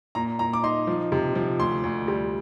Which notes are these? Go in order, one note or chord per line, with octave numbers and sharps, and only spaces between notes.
A#2 A#5
A#2 A#5
D6
D#4 C6
F3
C3
F3
D2 C6
D2
G3